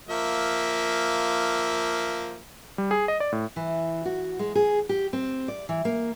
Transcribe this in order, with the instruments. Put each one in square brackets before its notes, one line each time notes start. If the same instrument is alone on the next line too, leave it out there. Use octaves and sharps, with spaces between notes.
[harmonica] F3 A#3 E5
[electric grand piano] G3
G#4
D#5
D5
A2
[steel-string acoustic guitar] E3
F#4
G#3
G#4
G4
C4
D5
E3
A#3